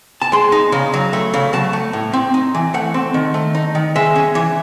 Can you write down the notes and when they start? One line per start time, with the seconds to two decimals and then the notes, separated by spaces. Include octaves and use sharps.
0.22 A5
0.32 G#3 C6
0.52 D#4
0.72 C#3
0.94 F#3
1.13 A3
1.34 C#3
1.53 F#3 A5
1.73 A3
1.93 A2
2.13 C4
2.34 D#4
2.55 E3
2.74 A3 F#5
2.94 C4
3.14 D#3
3.34 A3
3.55 D#4
3.75 D#3
3.96 G#3 E5
4.15 C#4
4.35 E3